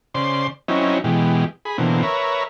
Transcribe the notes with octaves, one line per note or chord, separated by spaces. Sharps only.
C#3 C5 D5 C6
F#3 C4 C#4 D#4 E4
B2 E3 G#3 G4
G#4 B5
B2 D3 E3 A#3 C4
A#4 B4 C#5 E5